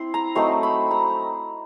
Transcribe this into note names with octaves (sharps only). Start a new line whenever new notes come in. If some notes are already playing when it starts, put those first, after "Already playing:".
Already playing: C4 E4 C6
A#5
F#3 A3 C4 D#4 C6
B5
A#5